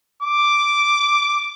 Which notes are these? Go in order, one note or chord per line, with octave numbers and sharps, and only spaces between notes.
D6